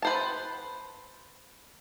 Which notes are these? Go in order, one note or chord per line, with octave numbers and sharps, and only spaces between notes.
B4 C5 A5